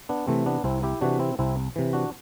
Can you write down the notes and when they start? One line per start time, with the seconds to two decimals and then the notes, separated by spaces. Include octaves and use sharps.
0.09 B3 D4
0.27 C3 E3 A3 C4
0.46 B3 D4
0.64 C2 C4 E4
0.83 E4 G4
1.01 C3 E3 D4 F#4
1.19 C4 E4
1.39 C2 C4 E4
1.76 C3 E3
1.93 D4 F#4